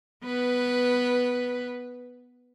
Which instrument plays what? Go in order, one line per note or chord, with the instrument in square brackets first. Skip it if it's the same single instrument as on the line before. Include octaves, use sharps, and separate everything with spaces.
[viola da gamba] B3 B4